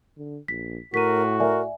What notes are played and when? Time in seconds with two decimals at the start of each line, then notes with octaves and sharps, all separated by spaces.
0.17 D3
0.48 A#1 B6
0.94 A2 F#4 A#4 B6 D#7
1.40 A#4 D5 E5 G#5